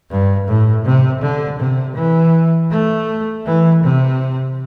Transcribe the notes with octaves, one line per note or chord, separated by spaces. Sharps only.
G2
A2
C3
D3
C3
E3
A3
E3
C3